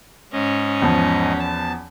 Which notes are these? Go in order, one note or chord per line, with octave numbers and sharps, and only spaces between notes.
G#2 C#4 D#5
E2 F3
A5